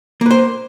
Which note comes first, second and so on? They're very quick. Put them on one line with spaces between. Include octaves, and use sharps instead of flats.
A#3 B4 C5